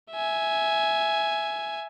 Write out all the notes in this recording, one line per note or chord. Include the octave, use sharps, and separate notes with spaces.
E5 G#5